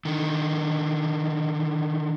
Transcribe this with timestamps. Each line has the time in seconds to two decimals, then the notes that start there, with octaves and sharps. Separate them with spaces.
0.05 D3 D#3